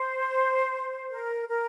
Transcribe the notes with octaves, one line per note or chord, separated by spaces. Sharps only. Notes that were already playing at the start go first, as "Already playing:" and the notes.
Already playing: C5
A#4
A#4